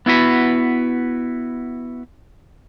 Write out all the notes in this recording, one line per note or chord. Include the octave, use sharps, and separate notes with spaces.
B3 E4 F#4 B4